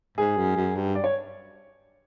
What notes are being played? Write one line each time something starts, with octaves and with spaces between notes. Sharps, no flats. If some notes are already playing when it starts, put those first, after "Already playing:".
G#2 G#4
F#2
F#2
G2
D5
C#5